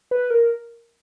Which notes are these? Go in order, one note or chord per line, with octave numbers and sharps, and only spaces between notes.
B4
A#4